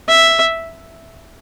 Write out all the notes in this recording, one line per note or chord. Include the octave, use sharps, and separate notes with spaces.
E5